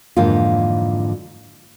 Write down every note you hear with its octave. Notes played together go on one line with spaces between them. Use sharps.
F2 G#2 D3 E3 A#3 F4